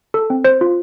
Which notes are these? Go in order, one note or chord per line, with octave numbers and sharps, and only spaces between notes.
A4
C4
C5
F4